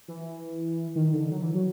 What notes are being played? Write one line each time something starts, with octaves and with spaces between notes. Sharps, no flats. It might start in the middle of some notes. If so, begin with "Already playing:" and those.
E3
D#3
D3
F#3
E3
F#3